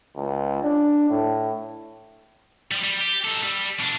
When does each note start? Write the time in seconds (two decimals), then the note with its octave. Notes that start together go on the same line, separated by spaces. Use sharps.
0.16 C#2
0.63 D4
1.10 A2
2.71 F3 G3
2.83 G3
3.00 G4
3.24 D#4 A4
3.43 G3
3.79 B2 D4